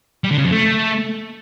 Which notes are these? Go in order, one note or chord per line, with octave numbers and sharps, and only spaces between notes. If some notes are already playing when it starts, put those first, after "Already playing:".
G3
D3
C#3
F2
A3